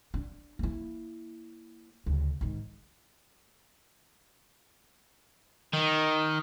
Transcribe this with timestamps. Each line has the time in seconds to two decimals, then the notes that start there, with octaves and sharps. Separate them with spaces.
0.14 D4
0.59 A#3 E4
2.06 D2 C#3
2.41 G#2 D#3
5.73 D#3